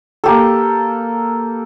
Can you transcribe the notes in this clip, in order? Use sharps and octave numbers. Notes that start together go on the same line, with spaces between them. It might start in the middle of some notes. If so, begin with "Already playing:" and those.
A#3 G4 A4